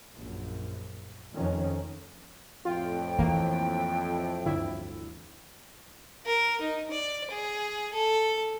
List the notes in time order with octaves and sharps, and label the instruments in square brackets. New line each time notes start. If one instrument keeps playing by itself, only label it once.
[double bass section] A#1 F#2
F1 F2 D#3 C#4
[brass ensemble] F2 A2 [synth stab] F4 [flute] G5
[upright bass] E3 [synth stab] A#3
[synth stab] G1 D2 E4
[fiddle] A#4
D#4
D5
G#4
A4